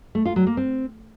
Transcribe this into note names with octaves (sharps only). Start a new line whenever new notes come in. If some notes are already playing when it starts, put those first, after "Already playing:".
A3
F4
F#3
A#3
C4